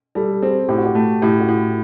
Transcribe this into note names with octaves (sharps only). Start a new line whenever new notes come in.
G3 A4
C4 G#4
A2 G4
F#4
G4
A3
A2 G4
F#4
A2